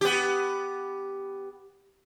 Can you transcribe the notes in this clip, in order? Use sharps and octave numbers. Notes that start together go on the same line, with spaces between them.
B3 G4